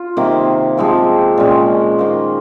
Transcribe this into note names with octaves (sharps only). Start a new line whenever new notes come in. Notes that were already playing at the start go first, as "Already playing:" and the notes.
Already playing: F4
C3 D#3 A#3
F3 G#3 C4 F4
A#2 G#3 C#4
D#3 A#3 F4 C5